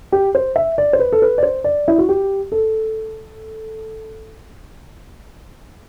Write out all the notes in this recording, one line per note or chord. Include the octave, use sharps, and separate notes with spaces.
G4
C5
E5
D5
C5
B4
A4
B4
D5
C5
D5
E4
F#4
G4
A4